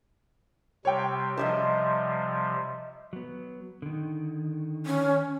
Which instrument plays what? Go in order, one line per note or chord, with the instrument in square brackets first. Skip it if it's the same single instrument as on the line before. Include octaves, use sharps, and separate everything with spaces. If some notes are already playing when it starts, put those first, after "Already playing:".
[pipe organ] C3 G3 [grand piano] C#5 G5
[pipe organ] C3 F3 G3 [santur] D#5 E5 E6
[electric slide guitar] F#3 B3
D3 D#3
[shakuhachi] C#4